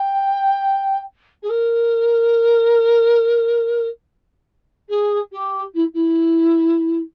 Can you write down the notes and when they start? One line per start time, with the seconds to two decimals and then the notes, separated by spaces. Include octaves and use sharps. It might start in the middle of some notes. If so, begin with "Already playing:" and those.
Already playing: G5
1.43 G#4
1.49 A#4
4.89 G#4
5.32 G4
5.74 E4
5.94 E4